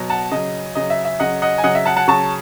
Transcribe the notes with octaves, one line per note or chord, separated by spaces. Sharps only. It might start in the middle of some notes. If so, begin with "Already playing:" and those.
Already playing: B2 F#3
F#5 A5
C#3 F#3 D#5
C#3 F#3 D#5
E5
E5
C#3 F#3 D#5 F#5
D#5 F#5
G#5
C#3 F#3 D#5 F#5
E5
F#5 A5
F#5 A5
C#3 F#3 A5 C#6